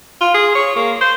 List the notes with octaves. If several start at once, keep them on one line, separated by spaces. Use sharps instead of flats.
F4
G#4
C#5
A#3
C5